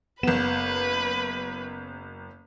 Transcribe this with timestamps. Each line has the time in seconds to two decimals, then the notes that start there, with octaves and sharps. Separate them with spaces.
0.23 F#1 B3 B4 E7